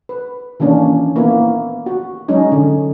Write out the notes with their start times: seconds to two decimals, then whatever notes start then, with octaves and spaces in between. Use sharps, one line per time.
0.09 B4
0.60 D#3 E3 A#3 C#4 D4
1.16 A#3 B3 E4
1.86 F#4
2.28 F#3 G#3 C#4 D#4
2.52 D3